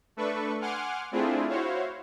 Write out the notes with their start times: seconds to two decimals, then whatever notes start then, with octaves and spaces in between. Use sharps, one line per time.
0.17 A3 D4 A4 B4 C#6
0.61 F#5 G#5 C6 D6 F6
1.12 A3 C4 D4 E4 F4 G#4
1.48 E4 F#4 C5 C#5 F5